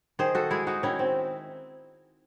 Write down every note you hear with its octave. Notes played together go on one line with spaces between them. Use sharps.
D#3 G#4 C5
F#4 A4
G#3 E4 G#4
D#4 F#4
D#3 C#4 E4
C4